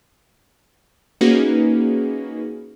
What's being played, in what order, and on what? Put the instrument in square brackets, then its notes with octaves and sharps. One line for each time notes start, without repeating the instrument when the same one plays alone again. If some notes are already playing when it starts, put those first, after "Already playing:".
[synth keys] A#3 C#4 D#4 F#4 G#4 B4